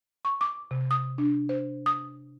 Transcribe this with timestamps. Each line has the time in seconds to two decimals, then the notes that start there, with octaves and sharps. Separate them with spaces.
0.25 C#6
0.41 D6
0.71 C3
0.91 D#6
1.18 D4
1.49 C5
1.86 D#6